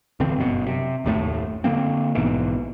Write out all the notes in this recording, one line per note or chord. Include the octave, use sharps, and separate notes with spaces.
D1 D3 E3 C4
G1 F#2 B2
C3
F#1 D#2 A2 A3
D3 D#3 A#3 C4
A#1 G#2 B2 E3